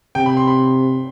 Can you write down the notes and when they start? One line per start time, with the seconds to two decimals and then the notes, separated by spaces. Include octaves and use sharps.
0.15 C3 G5
0.26 B5
0.37 C6
0.47 B5